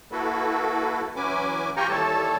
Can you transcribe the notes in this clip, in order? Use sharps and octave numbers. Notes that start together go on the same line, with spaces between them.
A#3 E4 F#4 A4 B4
E3 F#3 C#4 B4 G#5 D6
F4 G4 G5 G#5 A#5 C#6
D#2 E3 G3 A4 C#5 A5